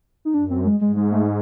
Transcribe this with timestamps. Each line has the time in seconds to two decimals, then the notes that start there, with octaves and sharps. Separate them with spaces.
0.25 D#4
0.34 F#2 D4
0.50 C4
0.65 G#3
0.81 G#2 G#3
0.96 G#3
1.12 A3